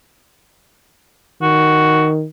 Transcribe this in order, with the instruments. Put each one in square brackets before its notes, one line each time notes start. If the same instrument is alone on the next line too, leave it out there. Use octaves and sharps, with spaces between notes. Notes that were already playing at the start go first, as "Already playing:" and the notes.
[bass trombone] D#3 [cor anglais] F#4